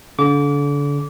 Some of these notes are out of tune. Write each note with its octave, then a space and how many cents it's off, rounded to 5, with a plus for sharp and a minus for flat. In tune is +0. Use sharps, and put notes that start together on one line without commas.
D3 -35 D6 -30